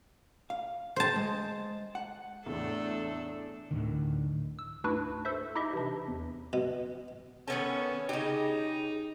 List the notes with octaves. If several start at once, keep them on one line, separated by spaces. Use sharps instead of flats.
F5
C5 A5
G#3
F#5
E2 A2 A3 D4 A4
D2 A2 D3 D#3
E6
D2 G#2 D4 E4 F#4 B4
A4 C5 E5
D#4 E4 G4 D#5 E5
C3 E3 D4
E2
B2
D#3 B3 C#4 A4
C#3 D#4 G4